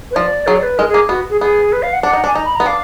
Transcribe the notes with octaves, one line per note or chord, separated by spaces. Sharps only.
B4
F3 D5
F#3 G#4
D5
B4
G#3 A#4
G#4
A#3
B3 F#4
G#4
B3 G#4
B4
F5
F#5
D4 F#5
D#4
D4
G#5
D#4 A#5
B5
B3 A#5
D4 F5